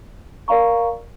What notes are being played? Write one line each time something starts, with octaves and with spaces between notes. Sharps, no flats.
A#4 D5 F5 A#5 C#6